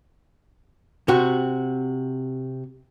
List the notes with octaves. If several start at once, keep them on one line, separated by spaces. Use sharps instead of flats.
C3 F#4